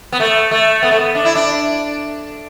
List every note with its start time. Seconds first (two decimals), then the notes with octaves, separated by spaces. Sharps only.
0.12 B3
0.20 A3
0.51 A3
0.83 B3
0.91 A3
0.99 B3
1.15 D4
1.25 E4
1.35 D4